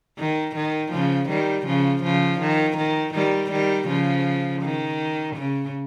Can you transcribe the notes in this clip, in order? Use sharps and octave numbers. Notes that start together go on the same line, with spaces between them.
D#3
D#3
C#3 F3
D#3 G3
C#3 F3
C#3 F3
D#3
D#3
D#3 G3
D#3 G3
C#3 F3
D#3
C#3